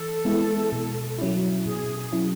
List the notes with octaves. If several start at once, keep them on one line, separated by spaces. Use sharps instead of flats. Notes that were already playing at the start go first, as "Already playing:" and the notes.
Already playing: E3 A4
G#3 B3 E4
B2
F#3 C#4 E4
B2 G#4
F#3 C#4 E4